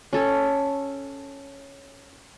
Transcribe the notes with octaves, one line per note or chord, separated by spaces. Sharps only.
C#4 A4 C#5